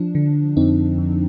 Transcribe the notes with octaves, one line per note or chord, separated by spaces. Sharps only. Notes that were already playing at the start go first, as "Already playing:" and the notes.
Already playing: F3 D4
D3
F2 C4 D#4
F2